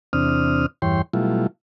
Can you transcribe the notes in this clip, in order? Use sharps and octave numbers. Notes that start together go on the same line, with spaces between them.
E2 C3 C4 D4 D#6 F6
E2 G2 E3 C#5 G5 C6
B2 F#3 G3 A3 E4 F4